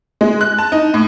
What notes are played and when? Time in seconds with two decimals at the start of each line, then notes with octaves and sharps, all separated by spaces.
0.21 G#3
0.41 F#6
0.59 A5
0.72 D#4
0.94 A2